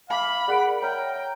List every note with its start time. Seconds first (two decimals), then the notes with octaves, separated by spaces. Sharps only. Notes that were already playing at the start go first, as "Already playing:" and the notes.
0.10 E5 F5 B5 D6 B6
0.48 G#4 A#4 D5 F#5 D7
0.82 C#5 E5 G5 A#5 F6